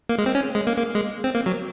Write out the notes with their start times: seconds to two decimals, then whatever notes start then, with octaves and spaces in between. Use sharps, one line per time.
0.09 A#3
0.18 G#3
0.26 C4
0.35 C#4
0.55 G#3
0.67 A#3
0.78 A#3
0.95 G#3
1.24 C4
1.35 A#3
1.46 F#3